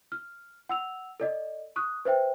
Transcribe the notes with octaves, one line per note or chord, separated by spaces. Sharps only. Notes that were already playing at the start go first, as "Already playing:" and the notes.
F6
F#5 E6 F7
A4 D5 D#5
C#6 D#6 F#6
B4 C5 E5 G5